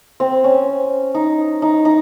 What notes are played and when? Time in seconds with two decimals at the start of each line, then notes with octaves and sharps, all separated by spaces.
0.20 C4
0.44 C#4
1.14 D#4
1.62 D#4
1.85 D#4